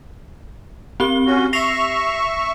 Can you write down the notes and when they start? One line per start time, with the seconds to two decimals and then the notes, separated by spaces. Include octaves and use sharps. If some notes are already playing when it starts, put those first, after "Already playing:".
1.00 C4 G4 G7
1.26 C#4 F#4
1.53 E5 C#6 A#6 C7 F7